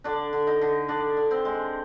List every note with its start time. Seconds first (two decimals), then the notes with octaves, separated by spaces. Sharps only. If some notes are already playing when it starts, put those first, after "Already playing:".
0.04 D3 D4 D5
0.33 D3
0.47 D#4 D#5
0.61 D3
0.88 D3 D4 D5
1.17 D3
1.31 C4 C5
1.45 G#3